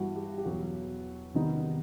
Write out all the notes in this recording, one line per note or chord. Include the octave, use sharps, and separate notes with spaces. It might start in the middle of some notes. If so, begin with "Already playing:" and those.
Already playing: G2 E3 B3 E4 F#4
G4
G4
E2 B2 F#3 F#4
C3 D#3 G3 B3 D#4